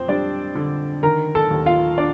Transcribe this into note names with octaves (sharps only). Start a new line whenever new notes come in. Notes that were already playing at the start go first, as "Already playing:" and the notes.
Already playing: F2 C4 C5
G3 D4 D5
D3
D#3 A#4 A#5
A4 A5
D#2
F4 F5
D4 D5